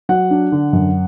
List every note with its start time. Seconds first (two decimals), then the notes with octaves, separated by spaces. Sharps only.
0.09 F#3 F#5
0.31 D4
0.52 D3
0.73 F#2